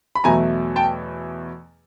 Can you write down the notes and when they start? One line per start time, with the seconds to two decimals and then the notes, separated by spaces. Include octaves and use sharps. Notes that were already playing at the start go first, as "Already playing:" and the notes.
0.15 B5
0.24 E2 B2 F#3 A3 G#5 A#5
0.76 G5 A5